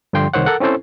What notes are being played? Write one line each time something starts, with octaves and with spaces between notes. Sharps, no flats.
G2 D3 F3 G5 C6
C2 D#3 C5 C#5 F#5
A4 A#4 F#5
C4 C#4 E4 A4 C5